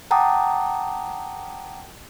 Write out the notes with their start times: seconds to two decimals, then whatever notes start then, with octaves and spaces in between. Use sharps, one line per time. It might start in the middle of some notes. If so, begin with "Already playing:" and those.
0.11 F#5 G5 A5 A#5 D6 D#6